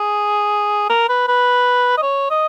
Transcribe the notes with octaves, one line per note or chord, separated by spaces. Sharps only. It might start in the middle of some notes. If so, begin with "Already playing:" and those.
Already playing: G#4
A#4
B4
B4
D#5
C#5
D#5